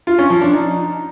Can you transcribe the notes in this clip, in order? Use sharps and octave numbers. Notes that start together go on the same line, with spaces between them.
F4
C#4
F3
D4
D#4